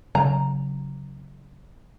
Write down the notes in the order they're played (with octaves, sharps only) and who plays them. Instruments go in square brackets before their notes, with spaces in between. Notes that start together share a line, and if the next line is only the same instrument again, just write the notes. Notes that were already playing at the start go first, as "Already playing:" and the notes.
[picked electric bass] C#3 F#3 [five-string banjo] A#5